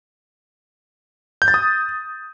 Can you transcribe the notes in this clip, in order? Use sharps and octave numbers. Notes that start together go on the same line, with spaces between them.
G6
A6
D#6